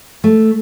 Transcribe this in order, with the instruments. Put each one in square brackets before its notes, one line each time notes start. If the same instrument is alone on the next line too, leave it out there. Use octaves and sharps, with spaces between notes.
[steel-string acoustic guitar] A3